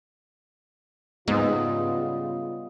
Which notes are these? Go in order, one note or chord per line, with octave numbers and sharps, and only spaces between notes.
G#2 C#3 G3 B3 F4 D#5